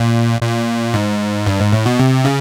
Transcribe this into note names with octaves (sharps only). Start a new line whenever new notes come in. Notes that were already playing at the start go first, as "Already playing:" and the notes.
Already playing: A#2
A#2
G#2
G2
G#2
A2
B2
C3
C#3